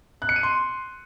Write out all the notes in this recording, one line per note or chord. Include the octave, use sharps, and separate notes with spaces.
F#6
C#7
D#7
C6